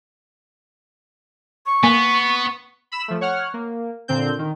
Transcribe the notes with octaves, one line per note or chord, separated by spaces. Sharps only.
C#6
A#3 B3 G#5
B5 E6 E7
F3 A3
C#5 F#5 F6
A#3
A#2 D3 C4 G6
D#3